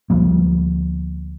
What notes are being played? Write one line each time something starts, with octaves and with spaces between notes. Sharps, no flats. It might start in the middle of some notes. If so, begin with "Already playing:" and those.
D2 F3 G3 A#3